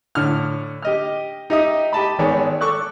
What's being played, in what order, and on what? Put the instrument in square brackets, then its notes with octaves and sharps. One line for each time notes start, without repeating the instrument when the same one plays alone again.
[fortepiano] A2 D3 F6
G4 D#5 F6
D#4 G4 D#5 E5 D#6
G4 D#5 A5 B5
G#1 D#3 G#3 B3 C#5 D5
A4 C#6 D6 F#6